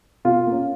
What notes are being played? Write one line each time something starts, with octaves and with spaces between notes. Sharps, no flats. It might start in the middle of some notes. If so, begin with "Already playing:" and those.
B2 F4
A#3
C#4